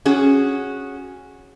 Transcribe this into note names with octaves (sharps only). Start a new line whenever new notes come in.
C#4 F#4 G#4